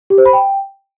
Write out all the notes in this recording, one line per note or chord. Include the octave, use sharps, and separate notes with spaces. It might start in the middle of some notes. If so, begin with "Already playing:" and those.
G4
C5
B5
G5